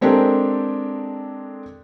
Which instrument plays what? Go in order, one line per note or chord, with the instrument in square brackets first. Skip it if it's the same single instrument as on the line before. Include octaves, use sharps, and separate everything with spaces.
[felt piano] G#3 C4 D4 G4 A4 A#4